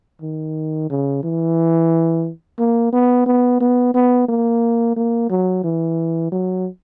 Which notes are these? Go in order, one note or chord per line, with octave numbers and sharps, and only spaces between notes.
D#3
C#3
E3
A#3
B3
B3
B3
B3
A#3
A#3
F#3
E3
F#3